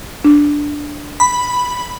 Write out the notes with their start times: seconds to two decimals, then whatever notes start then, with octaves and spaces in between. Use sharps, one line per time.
0.25 D4
1.20 B5